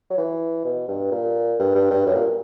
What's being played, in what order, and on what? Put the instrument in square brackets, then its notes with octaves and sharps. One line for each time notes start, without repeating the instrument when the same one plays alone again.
[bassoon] F#3
E3
B2
G2
A#2
G2
G2
G2
F#2
A#2